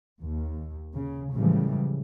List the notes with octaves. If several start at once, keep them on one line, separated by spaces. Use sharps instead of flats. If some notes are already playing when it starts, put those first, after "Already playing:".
D#2
C#3
A2 C#3 E3 F3 G3 G#3